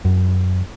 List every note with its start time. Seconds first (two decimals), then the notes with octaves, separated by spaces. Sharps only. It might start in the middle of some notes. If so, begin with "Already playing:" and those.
0.05 F#2